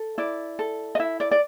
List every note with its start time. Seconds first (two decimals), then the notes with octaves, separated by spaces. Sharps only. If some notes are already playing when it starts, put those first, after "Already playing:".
Already playing: A4
0.18 E4 D5
0.59 A4
0.95 D#5
0.99 E4 E5
1.20 D5
1.31 D5